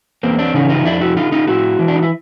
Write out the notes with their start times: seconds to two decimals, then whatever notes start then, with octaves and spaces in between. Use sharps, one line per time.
0.23 E2 A#3 C4
0.39 C4 D4
0.54 C#3 E3 C#4 D#4
0.70 D#4 F4
0.85 F2 D4 E4
1.01 E4 F#4
1.16 D3 D#4 F4
1.32 D#4 F4
1.47 A2 E4 F#4
1.79 E3
1.88 D4
1.95 D#4
2.03 E4